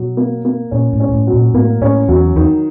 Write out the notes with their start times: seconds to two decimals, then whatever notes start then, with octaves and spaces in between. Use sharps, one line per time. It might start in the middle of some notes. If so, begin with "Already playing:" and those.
Already playing: B2 F#3
0.17 A#3
0.45 A#3
0.71 A#2 C#4
0.93 A2
1.00 C#4
1.09 A#2
1.13 A2
1.27 F#3
1.34 A#2
1.54 A2 A#3
1.81 A2 C#4
2.08 E2 F#3
2.36 E2 D#3